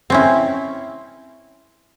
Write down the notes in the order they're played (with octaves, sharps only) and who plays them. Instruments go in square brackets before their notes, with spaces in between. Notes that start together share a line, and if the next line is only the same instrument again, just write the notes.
[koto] C4 C#4 E4